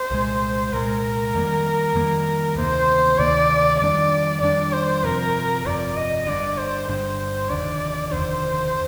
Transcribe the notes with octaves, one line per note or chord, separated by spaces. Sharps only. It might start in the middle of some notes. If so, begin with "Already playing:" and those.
Already playing: C5
C2 A#2 G#3
C2 A#2 G#3 A#4
F2 D#3 G3 A#3
F2 D#3 G3 A#3
D2 C3 D#3 A#3 C5
D2 C3 D#3 A#3 D5
F2 D#3 G3 D4 D5
F2 D#3 G3 D4 D5
C5
G1 F2 C3 F3 A#4
G1 F2 C3 F3 D5
D#5
G1 G2 D3 D5
C5
G1 G2 D3 C5
F1 D#2 D3 D5
F1 D#2 D3 C5